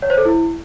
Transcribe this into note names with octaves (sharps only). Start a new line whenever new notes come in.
C#5
C5
A4
E4